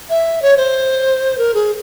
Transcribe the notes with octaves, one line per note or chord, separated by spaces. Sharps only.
E5
C#5
C5
A#4
G#4